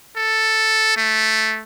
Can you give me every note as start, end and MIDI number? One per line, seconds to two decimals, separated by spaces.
0.16 0.94 69
0.97 1.62 57